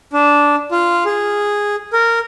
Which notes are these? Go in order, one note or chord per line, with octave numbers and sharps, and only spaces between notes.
D4
F4
G#4
A#4